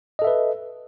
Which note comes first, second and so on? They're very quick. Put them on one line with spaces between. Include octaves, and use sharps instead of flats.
D#5 A4 E5 B4